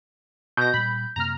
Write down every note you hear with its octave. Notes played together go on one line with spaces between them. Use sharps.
B2 G6 A#6
A#2 G3 B5
F#2 C3 A#3 A#5 F6